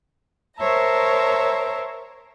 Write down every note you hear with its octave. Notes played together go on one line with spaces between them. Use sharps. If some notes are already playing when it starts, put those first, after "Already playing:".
A#4 C5 C#5 E5 A5 A#5